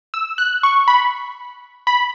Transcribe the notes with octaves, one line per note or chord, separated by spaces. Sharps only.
E6
F#6
C#6
B5
B5